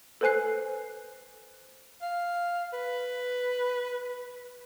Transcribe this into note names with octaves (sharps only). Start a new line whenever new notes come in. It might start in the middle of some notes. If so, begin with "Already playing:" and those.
A4 B4 C5 G#5 F#6 C7
F5
B4